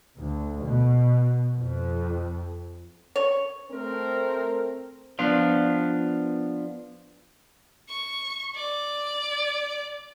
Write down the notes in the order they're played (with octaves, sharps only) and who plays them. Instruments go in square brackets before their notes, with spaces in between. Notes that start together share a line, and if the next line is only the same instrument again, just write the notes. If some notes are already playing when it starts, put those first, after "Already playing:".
[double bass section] D2
B2
F2
[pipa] C#5
[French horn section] A3 C4 A#4
[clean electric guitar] F3 B3 D4 F4
[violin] C#6
D5